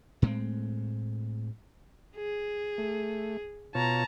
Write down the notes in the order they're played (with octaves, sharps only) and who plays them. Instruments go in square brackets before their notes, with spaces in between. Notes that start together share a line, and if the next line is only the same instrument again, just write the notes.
[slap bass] A2 G#3 B3 C4
[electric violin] G#4
[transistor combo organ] A3
[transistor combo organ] B2 F4 C#5 [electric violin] A5 A#5